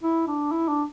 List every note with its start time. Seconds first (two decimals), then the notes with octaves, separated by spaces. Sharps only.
0.03 E4
0.27 D4
0.51 E4
0.68 D4